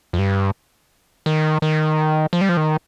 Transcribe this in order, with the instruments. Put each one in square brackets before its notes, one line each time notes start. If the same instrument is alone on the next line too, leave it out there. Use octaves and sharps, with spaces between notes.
[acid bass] F2
G2
D#3
D#3
F3
G3
F3
D#3